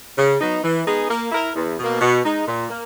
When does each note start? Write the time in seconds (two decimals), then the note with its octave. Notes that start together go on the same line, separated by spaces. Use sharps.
0.18 C#3
0.40 F#3 B3 D#4
0.64 E3
0.86 G#3 B3 D#4 G#4
1.10 A#3
1.32 E4 A#4
1.56 E2
1.78 B2
1.83 A#3
2.01 B2
2.24 G#3 D#4
2.48 A#2
2.70 A#3